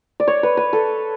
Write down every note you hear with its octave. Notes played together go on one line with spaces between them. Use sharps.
D5
C#5
B4
B4
A4